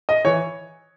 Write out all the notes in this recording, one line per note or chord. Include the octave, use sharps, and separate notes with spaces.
D#5
E3 C#5